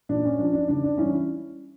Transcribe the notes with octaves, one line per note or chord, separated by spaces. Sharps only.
A#2 D4
C#4
F3 D4
D4
C#3 D4
D4
E3 G3 C#4 E4